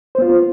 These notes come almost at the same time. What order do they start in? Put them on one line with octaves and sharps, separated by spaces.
C5 B3 F4